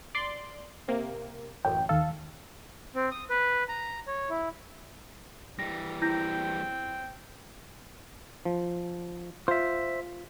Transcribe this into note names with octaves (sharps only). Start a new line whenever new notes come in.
D5 C6
C3 A#3
A1 F#2 G5
D#2 D#3 A4 F5
C4
D#6
B4
A#5
C#5
E4
E3 G3 A#6
C4 E4 G5 G6 A#6
F3
F4 C5 E5